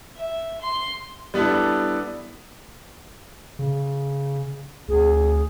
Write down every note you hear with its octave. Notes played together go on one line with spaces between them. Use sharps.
E5
C6
G3 B3 D4 E4 A4
C#3
D2 G#4